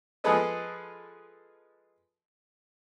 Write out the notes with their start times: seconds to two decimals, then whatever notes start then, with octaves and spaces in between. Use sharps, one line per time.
0.24 F3 G#3 G#4 A4 B4 D#5